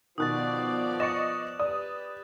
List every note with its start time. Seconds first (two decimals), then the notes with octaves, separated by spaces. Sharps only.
0.18 B2 D#3 F3 B3 D5 D#6 F#6 A6
1.00 D#5 C#6 A6 C#7 E7
1.60 G4 B4 D5 D#6